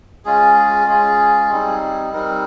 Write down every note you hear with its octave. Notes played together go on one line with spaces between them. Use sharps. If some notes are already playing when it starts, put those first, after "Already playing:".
G#3 C#4 F4 G#4
G#3 C#4 F4 G#4
G3 C4 D#4
G3 C4 D#4 A#4